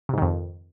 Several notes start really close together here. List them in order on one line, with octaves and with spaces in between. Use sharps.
C3 G#2 D#3 F2